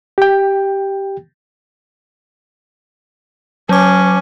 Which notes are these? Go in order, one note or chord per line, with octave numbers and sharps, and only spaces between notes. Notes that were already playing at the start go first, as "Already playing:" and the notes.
G4 G5
F#3 C#4 D6